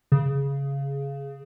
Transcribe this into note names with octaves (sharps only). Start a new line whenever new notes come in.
C#3